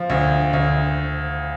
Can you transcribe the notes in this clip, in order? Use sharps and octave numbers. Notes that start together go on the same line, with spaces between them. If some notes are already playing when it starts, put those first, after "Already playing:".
Already playing: F3
D2
D2